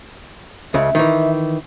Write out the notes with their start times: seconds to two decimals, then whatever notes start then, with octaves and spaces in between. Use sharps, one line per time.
0.74 C#2 C#3 E5
0.95 D#3 E3